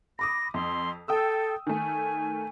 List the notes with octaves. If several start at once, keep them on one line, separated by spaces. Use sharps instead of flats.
B5 D6 D#6 A#6
F2 C6
A4 G5 D#6 E6
D#3 A3 G#5